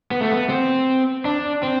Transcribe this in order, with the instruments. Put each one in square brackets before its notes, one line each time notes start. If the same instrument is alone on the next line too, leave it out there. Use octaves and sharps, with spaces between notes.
[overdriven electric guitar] B3
A3
B3
C4
D4
C4